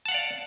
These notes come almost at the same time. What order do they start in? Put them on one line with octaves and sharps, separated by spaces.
A5 F#5 F5 D5